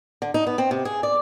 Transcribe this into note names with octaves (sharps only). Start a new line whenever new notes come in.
D3
D#4
B3
C4
C3
G#4
D5